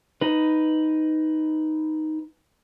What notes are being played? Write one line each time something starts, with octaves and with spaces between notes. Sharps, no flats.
D#4 B4